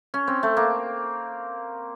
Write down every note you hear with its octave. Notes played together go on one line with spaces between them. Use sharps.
C#4
C4
A3
A#3